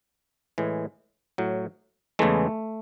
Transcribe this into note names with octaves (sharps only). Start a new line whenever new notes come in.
A2 E3 G#3
A2 F#3
E2 C#3 E3 G#3 A3